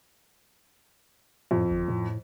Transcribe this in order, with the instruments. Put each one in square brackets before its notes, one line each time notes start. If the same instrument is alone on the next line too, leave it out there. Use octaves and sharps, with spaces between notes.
[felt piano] F2 [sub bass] A2
[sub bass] G1
A2